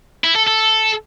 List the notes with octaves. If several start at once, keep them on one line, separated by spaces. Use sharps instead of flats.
E4
A4
A4